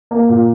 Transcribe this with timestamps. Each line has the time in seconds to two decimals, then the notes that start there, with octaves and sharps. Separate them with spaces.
0.11 A#3
0.29 A#2